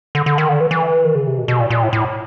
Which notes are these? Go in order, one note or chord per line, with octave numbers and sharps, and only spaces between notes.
D3
D3
D#3
D3
E3
E3
D#3
C#3
C3
B2
B2
A#2
A#2
A2
A2